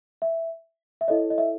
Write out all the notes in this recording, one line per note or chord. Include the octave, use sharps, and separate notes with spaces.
E5
E5
E4 A4 C#5 D#5
D#5
E5